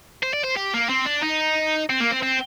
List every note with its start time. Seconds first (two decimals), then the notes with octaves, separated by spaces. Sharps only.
0.23 C5
0.33 D5
0.44 C5
0.56 G4
0.74 A#3
0.89 C4
1.06 D4
1.24 D#4
1.90 C4
2.01 A#3
2.12 C4
2.23 C4